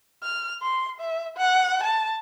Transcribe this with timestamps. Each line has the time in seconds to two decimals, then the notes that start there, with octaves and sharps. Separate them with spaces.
0.23 F6
0.62 C6
1.00 E5
1.37 F#5
1.84 A5